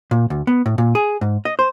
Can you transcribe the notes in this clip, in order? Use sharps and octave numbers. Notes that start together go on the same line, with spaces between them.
A#2
D2
B3
A2
A#2
G#4
G#2
D#5
C5